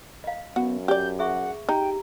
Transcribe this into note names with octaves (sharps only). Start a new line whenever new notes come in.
D#5 F5
F#2 B3 F#4
G4 D5 G6
G#4 E5 F#5 C#6
D#4 G4 G5 A#5